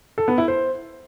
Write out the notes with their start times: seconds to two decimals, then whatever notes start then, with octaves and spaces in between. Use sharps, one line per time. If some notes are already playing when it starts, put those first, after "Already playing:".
0.18 A4
0.28 B3
0.38 E4
0.48 C5